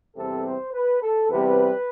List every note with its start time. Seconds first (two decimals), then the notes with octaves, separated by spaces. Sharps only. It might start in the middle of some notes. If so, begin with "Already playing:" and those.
0.15 E2 C3 G3 C4 A4
0.45 C5
0.73 B4
1.01 A4
1.29 E2 C3 G3 C4 B4